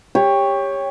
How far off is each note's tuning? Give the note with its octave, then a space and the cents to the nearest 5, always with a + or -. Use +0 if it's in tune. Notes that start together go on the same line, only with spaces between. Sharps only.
G4 +20 C#5 +0